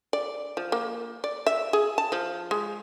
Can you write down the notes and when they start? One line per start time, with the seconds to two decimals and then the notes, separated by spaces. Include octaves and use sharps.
0.13 D5
0.57 F3
0.72 A#3
1.24 D5
1.47 E5
1.73 G#4
1.98 A5
2.12 F3
2.51 G#3